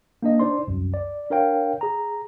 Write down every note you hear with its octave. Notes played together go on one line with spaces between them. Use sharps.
A#3 D4 D#5
D4 D#4 C5 D5 C6
C2 F#2
D5
D4 A#4 C#5 F5 G5
G#4 A#5